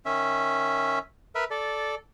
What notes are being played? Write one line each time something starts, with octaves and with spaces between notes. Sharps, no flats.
D#3 C#4 E5
A#4 B4 E5
A4 D5